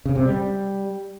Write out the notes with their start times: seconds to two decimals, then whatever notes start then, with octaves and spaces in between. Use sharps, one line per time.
0.06 C#3
0.15 C3
0.25 G3